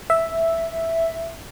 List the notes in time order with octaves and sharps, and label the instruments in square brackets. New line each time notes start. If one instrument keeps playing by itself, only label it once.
[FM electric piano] E5